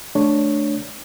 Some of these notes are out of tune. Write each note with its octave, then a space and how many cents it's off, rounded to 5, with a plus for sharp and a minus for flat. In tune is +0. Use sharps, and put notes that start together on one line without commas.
A3 -15 D4 +0 C#5 +0